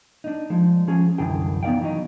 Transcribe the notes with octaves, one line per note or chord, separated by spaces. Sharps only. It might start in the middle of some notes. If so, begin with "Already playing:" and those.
D4 D#4
F3 G#3
F3 C#4 G#4
C2 F#2 D3 E3 G#4 G5
B3 D#4 D5 F5 G5
E3 F#3 D#4